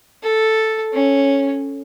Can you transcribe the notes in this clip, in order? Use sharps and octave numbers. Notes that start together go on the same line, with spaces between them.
A4
C#4